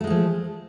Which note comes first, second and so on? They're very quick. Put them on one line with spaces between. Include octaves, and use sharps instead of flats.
A3 G#3 G#4 F3